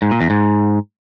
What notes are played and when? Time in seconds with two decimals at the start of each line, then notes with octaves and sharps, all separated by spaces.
0.02 G#2
0.11 A#2
0.21 E2
0.30 G#2